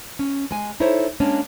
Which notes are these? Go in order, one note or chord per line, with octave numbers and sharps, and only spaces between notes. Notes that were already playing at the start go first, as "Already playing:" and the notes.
C#4
G#3 G#5
D#4 E4 A4 C5 C#5
G#3 A#3 C#4 D4